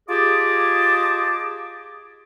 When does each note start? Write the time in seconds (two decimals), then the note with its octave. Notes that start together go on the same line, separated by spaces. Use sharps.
0.09 F4 G4 G#4 D#5 A5 D6